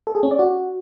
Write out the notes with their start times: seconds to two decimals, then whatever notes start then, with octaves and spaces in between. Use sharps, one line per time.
0.07 A4
0.15 G#4
0.23 C#4
0.31 D5
0.39 F#4